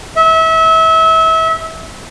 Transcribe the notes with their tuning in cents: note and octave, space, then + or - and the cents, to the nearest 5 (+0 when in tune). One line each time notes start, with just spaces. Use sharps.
E5 -30